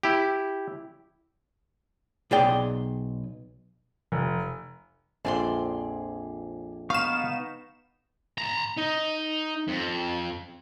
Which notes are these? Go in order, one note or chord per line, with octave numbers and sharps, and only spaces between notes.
E4 G4
B1 G#4 D5 G5
F1
A#1 F2 G#4 D5 A5 C6
B3 D#4 F5 C#6 E7
A5 A#5
D#4
F2